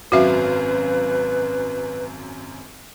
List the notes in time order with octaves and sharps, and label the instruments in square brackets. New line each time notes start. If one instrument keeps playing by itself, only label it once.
[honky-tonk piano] G#1 F#2 F5 [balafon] F#4 E5 [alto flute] B4